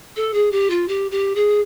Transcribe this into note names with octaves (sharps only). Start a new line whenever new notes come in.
A4
G#4
G4
F4
G4
G4
G#4